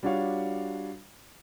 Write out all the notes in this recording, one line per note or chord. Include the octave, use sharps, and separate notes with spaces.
G3 D4 F4 F#4 C#5 F5